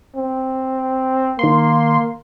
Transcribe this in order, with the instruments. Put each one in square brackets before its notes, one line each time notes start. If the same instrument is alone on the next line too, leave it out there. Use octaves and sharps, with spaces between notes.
[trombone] C4
[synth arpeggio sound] D#3 C6 [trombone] A#3